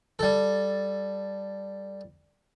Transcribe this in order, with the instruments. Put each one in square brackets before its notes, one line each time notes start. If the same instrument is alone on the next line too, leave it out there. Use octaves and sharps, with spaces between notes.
[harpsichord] G3 A4